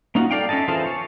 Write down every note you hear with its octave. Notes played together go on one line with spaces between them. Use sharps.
A#3 C#4 D#4 F4 F#4
A4 D5 F5 G5
C#4 E4 A4 D#5 A5
E3 F4 G#4 A4 C5
C#5